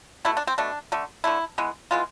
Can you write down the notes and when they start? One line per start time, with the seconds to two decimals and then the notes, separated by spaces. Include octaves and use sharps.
0.25 B2 A3 E4
0.37 D4
0.47 C4
0.58 B2 A3 D4
0.92 D3 A3
1.24 D3 A3 E4
1.58 E3 G#3 B3
1.91 E3 G#3 B3 F4